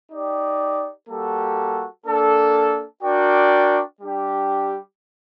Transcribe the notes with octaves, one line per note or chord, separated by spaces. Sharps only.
D#4 G4 D5
G3 A#3 F#4 A4
A#3 D4 A4
D4 F#4 A#4 D5 G5
G3 D4 G4